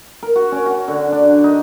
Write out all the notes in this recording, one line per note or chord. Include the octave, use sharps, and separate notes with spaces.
A#4
F#4
C#4
F#4
D3
D4
D#4